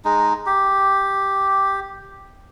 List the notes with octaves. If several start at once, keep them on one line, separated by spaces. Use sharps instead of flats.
G#3 D#4
G4